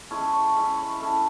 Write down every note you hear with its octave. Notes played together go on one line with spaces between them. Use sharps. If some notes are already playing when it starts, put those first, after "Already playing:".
G#3 C#4 E4 A5
C#6
G#3 C#4 E4 B5
C#6
B5
A3 C#4 E4 A5